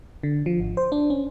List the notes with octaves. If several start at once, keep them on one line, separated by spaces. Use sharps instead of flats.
D3
F3
G#1
C5
D4
C#4